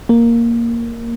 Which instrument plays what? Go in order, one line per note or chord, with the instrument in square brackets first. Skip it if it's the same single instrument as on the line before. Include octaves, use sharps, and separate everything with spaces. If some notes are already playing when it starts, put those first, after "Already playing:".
[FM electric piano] A#3